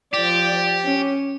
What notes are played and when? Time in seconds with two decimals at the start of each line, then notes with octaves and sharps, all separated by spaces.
0.14 F3 G4 D5
0.84 C#4